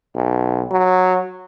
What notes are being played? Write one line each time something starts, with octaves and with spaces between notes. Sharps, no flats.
B1
F#3